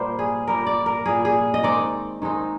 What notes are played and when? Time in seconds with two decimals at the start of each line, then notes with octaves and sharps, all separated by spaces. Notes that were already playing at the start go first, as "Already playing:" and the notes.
Already playing: A#2 G3 A#3 A#4 C5
0.19 G#4
0.47 A#2 G3 A#3 A#4
0.67 D5
0.86 A#4
1.06 A#2 G3 A#3 G#4
1.25 G#4
1.54 D#5
1.63 D#3 G#3 C4 D#4 D5
2.22 D#3 G#3 C4 D#4